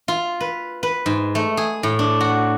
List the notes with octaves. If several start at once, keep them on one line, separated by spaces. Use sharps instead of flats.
F4
B4
B4
G#2
A3
G#4
A2
D4
F#4